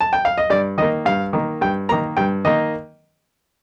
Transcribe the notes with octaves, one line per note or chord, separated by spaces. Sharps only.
A5
G5
F5
D#5
G2 D5
D#3 A#3 D#5
G2 F5
D#3 A#3
G2 G5
D#3 A#3 A#5
G2 G5
D#3 A#3 D#5